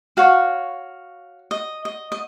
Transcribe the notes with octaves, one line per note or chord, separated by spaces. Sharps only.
F#4 C#5 F5
D#5
D#5
D#5